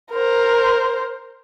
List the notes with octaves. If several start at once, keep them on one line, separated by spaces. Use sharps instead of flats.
A#4 C5